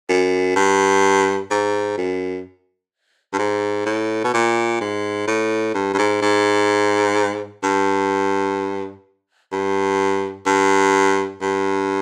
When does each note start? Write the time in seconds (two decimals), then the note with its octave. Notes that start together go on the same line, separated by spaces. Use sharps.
0.09 F#2
0.56 G2
1.51 G#2
1.97 F#2
3.33 G2
3.38 G#2
3.86 A2
4.24 B2
4.34 A#2
4.81 G#2
5.28 A2
5.75 G2
5.94 G2
5.98 G#2
6.22 G#2
7.63 G2
9.52 G2
10.46 G2
11.41 G2